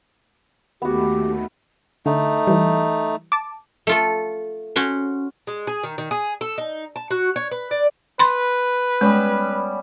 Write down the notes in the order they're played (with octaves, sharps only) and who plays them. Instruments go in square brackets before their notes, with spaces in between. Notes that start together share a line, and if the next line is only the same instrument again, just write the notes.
[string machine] D#2 D#3 A3 [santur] B3 F#4 [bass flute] G4
[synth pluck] D3 [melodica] A3 D#4
[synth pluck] E3 G3
A5 D6
[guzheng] A3 F4 A4
C#4 F#4 C5
[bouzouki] G#3
G#4
D#3
D#3
G#4
A4
D#4
A5
F#4
C#5
B4
D5
[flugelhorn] B4 [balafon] B5 C6
[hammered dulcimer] G3 B3 C#4 [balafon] G#3